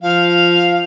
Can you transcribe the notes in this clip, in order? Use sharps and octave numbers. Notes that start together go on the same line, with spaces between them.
F3 F5